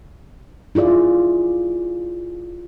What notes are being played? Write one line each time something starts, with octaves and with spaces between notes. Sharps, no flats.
E4 F4 G#4 D5